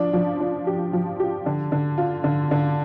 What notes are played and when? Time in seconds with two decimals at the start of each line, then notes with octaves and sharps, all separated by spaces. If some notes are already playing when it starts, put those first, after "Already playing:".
Already playing: F3 D4
0.13 F3
0.40 D4
0.67 G4
0.93 F3
1.20 G4
1.46 D3
1.72 D3
1.98 F4
2.24 D3
2.51 D3